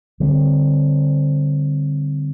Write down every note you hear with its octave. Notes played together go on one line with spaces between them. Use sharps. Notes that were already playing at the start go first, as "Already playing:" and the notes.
D3 G3 C4